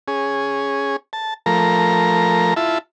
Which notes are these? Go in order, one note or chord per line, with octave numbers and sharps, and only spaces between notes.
C#4 G#4
A5
F3 A3 A#4 A#5
E4 F4 E5 A5